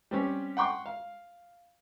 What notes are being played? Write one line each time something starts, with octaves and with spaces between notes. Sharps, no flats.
G3 C4 C#4
F#5 G5 C6 C#6
F5